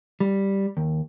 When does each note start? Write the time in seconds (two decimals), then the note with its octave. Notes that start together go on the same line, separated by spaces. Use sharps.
0.20 G3
0.77 D#2